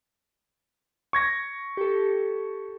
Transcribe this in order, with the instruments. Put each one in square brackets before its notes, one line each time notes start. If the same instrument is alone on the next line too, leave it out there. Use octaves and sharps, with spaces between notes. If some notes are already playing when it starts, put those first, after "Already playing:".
[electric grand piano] C#6 G#6 A#6
[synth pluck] G4 A4